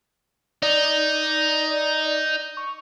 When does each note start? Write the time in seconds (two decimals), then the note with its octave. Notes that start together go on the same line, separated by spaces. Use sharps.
0.63 D#4 D5
2.57 C#6